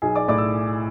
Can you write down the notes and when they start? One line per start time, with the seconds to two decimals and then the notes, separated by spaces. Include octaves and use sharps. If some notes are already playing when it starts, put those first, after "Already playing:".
0.02 B1 G#4 G#5
0.16 D5 D6
0.28 A2 D5 D6
0.38 E6